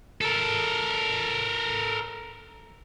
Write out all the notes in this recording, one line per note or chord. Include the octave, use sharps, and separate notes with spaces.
A4 A#4